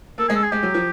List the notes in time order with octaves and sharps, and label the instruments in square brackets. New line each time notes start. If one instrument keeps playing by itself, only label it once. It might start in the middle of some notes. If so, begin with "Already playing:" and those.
[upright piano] A#3 [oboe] A4
[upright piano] G#3 [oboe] G#4
[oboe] A4
G#4
[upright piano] G#3 [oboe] G4
[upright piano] F#3
F3